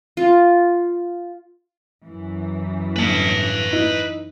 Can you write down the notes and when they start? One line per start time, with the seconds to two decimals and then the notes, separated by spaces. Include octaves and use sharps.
0.17 F4
2.04 F#2 E3
2.96 G1 B4 A5
3.73 D#4 E4